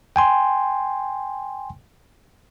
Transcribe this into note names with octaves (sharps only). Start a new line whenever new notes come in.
G5 G#5 C6